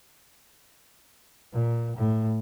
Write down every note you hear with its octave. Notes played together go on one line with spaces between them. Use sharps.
A#2
A2